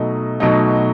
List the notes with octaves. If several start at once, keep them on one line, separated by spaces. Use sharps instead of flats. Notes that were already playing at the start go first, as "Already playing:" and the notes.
Already playing: B2 F#3 A3 D#4
B2 F#3 A3 D#4